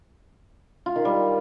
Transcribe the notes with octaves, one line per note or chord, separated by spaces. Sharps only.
F4
D#3
G3